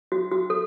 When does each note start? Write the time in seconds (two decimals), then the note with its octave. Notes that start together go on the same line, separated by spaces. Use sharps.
0.12 F#4
0.31 F#4
0.50 A4